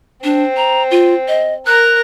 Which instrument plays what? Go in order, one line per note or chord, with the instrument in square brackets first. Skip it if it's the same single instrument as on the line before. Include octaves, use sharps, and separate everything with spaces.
[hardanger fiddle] C4 [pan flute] D4
[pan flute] A#5
F4
D#5
[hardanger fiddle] A#4 A#5 [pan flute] F#6